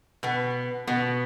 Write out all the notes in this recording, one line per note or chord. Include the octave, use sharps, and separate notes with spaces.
B2 B3
B2 B3